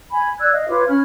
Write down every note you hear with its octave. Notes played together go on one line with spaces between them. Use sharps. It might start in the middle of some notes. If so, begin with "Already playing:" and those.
G#5 B5
D5 E6 F#6 G#6
D#5 F5
F4 B4 C#5 D6
C#4 B5 F6